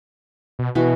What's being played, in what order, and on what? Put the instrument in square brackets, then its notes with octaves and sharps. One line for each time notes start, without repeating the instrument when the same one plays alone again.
[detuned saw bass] B2
[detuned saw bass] B2 [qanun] E3 F#4